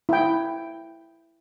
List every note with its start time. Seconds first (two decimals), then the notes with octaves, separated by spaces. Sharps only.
0.09 E4 G5